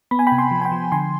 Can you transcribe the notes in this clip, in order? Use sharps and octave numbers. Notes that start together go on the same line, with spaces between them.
B3 B5
G#5
G5 B5
C3
G#5 C6
F3
G#5
G5 B5
F3
D3 G#5 C6